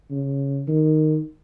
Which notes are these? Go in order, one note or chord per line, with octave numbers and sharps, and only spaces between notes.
C#3
D#3